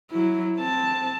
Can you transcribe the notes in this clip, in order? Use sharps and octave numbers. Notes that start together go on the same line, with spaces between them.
F#3 E4
C4 A5